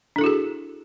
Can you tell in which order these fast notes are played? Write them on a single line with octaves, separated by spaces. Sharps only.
D4 A4 E4 F#4 G#4